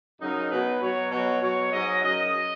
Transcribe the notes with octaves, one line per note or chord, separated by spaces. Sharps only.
F#2 C#3 F#3 D#4
B2 F#3 B4
B2 F#3 C#5
B2 F#3 C#5
B2 F#3 C#5
G#2 F#3 D#5
F#2 C#3 F#3 D#5